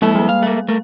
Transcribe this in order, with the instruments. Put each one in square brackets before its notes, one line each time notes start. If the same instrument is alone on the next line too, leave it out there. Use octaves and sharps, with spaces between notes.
[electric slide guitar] F2 E4 A4 [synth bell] G#3 A#3
[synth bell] G3 A#3
[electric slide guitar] F5
[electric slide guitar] A3 A#3 [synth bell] F5
[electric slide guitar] A3 A#4